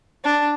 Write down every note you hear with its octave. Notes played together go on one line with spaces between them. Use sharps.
D4